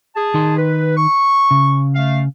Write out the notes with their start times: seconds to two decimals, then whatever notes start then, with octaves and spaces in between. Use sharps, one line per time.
0.15 G#4 A5
0.34 D#3 D#4 C6
0.57 B4
0.96 C#6
1.51 C#3
1.95 A3 F5